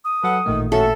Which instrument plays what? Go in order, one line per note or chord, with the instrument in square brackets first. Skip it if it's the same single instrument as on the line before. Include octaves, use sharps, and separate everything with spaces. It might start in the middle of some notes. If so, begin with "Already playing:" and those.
[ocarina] D#6
[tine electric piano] F#3 [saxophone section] A4 B4 F#5
[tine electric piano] A1 A#2 A3 [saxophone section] D#3
[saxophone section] C#4 F#4 [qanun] A4 [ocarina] E5